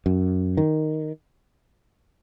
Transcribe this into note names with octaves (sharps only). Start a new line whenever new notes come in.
F#2
D#3